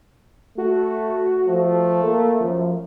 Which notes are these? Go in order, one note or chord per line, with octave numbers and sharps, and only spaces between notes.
A3 F#4
F3 A3
A#3 A4
F#2 F3